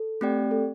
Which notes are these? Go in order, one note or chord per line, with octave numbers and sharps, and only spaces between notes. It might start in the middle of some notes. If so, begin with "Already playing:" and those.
Already playing: A4
A3 C4 G4 D5 G5
A4